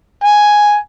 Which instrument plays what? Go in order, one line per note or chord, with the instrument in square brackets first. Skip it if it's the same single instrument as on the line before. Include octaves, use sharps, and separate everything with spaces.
[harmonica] G#5